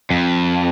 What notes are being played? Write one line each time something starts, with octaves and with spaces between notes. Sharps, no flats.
F2